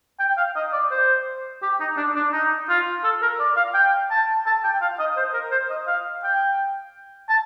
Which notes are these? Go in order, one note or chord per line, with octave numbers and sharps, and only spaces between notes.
G5
F5
D#5
D5
C5
G4
D#4
D4
D4
D#4
F4
A4
A#4
D5
F5
G5
A5
A5
G5
F5
D#5
C5
A#4
C5
D#5
F5
G5
A5